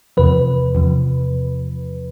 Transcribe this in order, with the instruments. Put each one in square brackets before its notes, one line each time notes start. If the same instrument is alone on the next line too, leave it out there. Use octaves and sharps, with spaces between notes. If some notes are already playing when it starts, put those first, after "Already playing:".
[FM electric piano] E2 C3 F3 B4
E2 C3 F3